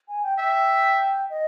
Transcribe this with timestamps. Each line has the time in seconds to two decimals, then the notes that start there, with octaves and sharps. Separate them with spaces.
0.08 G#5
0.23 G5
0.38 E5 G5
1.30 D#5